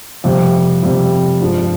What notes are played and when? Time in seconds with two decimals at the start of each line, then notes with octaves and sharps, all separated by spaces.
0.24 F2 C3 G3
0.83 F2 C3 G3
1.40 G2 F3 G#3